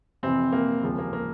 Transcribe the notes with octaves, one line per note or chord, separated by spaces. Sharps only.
F2 C3 E3 C4
A#3
D#2 C#3 F3 G#3
A#3
A#3